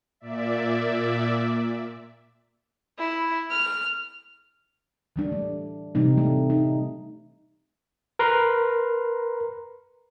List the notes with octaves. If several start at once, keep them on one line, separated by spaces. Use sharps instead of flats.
A#2 D5 E5
E4
F6
E3 G3 D4
A3
C3 E3 G3 C4 D#4
A3
D#4
A#4 B4 A#5 C6